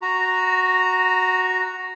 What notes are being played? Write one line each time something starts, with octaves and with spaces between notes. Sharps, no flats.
F#4 A#5